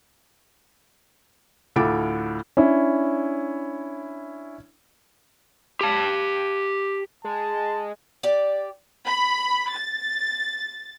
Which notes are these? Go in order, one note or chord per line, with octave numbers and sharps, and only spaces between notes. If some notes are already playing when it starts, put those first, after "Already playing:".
D2 A2 F4 A4 D6 D7
C#4 D4 E4
G4 A5
G#3 A5
G4 D5
B5
A6